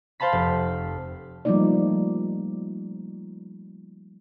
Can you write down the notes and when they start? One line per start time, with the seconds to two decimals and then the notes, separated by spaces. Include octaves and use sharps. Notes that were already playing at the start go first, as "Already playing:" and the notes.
0.20 C5 F5 A5 B5 B6
0.33 F1
1.45 F3 G3 A3 A#3 D#4 D5